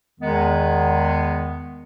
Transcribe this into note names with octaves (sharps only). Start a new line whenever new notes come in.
E2 D#3 G#3 B3